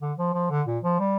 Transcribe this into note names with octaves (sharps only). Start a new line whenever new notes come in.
D3
F3
F3
D3
A#2
F3
G3